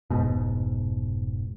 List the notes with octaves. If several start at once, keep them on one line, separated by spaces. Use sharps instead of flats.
F1 G#2 B2